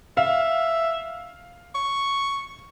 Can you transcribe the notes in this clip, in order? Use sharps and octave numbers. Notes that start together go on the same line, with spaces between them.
E5 F5
C#6